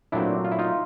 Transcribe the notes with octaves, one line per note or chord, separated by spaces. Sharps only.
A#2 F#3 A3 C4 D4 E4
F4
E4
D#4 F4